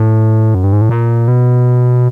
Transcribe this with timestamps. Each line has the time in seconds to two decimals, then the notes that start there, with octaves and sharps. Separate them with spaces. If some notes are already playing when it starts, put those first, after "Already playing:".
Already playing: A2
0.55 F#2
0.64 G2
0.73 G#2
0.81 A2
0.89 A#2
1.28 B2